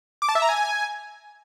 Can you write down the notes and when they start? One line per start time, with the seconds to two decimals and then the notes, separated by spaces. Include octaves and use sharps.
0.22 D6
0.29 A5
0.35 E5
0.42 A#5
0.49 G#5